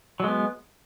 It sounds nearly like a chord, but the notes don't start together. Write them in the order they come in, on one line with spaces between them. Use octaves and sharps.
F#3 G#3 B3